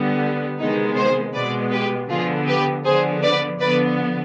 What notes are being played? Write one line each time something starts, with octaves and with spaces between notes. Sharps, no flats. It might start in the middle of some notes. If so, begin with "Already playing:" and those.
Already playing: D3 G3 B3
C3 D#3 G#3 B3 D#4
G#4 C5
B2 G#3 B3 B4 D5
G4 B4
D3 F3 B3 F4 G#4
G4 B4
D3 F3 B3 G#4 C5
B4 D5
D3 F3 B3 B4 D5